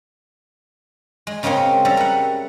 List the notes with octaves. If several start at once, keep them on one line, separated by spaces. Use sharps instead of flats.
G#3
C#3 G#3 A#3 C4 C#4
G3 C#4 E5 A#5
A#4 F#5